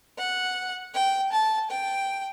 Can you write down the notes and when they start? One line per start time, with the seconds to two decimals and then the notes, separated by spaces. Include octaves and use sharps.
0.18 F#5
0.94 G5
1.32 A5
1.70 G5